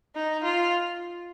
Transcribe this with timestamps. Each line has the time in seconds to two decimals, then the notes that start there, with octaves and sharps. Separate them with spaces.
0.16 D#4
0.44 F4